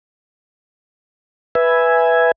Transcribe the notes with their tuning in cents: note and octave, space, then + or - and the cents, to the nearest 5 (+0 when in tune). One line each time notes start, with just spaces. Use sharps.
B4 +0 E5 +0 G#5 +0